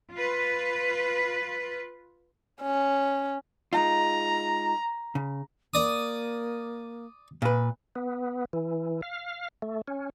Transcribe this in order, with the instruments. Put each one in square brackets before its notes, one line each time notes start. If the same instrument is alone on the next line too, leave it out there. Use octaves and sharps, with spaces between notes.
[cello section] F4 B4
[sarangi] C#4
[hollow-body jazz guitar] G#3 D#4 F4 [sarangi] A#5
[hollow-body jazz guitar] C#3
[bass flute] A#3 [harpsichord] D5 D#6
[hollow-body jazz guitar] A#2 B4
[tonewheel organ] B3
E3
F5
A3
C#4